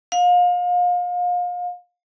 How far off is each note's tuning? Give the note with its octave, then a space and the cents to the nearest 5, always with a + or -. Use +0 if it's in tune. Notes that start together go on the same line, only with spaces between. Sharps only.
F5 +35